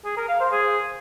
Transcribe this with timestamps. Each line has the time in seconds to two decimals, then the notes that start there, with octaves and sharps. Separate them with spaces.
0.05 G#4
0.17 A#4
0.29 F5
0.40 C5
0.52 G#4